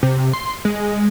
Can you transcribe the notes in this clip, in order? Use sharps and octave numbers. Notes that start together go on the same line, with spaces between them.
C3
C6
G#3